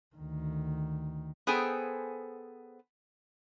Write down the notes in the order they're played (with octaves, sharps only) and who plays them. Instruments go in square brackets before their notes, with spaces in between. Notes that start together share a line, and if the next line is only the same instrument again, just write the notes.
[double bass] D2 D#3
[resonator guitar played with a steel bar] B3 G#4 A4 C5 G5 G#5